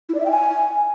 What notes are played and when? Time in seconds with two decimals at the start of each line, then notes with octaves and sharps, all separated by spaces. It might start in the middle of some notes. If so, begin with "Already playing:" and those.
0.09 E4
0.15 D5
0.20 E5
0.26 G5
0.31 G#5